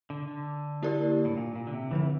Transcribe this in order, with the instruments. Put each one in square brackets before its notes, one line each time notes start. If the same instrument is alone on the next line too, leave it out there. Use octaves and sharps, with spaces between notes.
[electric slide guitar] D3
D3
[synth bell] A#3 E4 G4 A#4 D5
[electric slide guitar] A2
A#2
A#2
D3
C3
[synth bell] D3 F3 C4 [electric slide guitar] E3